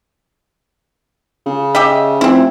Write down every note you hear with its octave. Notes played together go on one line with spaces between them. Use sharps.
C#3
G4 D#5 E5
F1 C4 E4